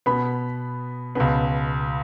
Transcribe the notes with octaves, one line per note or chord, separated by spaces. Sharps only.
B2 B3 B5
C#2 B2 B3